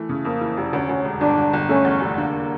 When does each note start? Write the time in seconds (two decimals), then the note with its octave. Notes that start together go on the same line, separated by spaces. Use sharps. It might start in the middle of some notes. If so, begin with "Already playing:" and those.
Already playing: E3 A3
0.09 C#3
0.25 F2 A#3
0.41 E3
0.57 F1
0.73 D2 C#4
0.89 D2
1.05 E1
1.21 G1 D4
1.37 D3
1.53 G1
1.69 A3 C#4
1.85 E2
2.01 F1
2.17 D3 A#3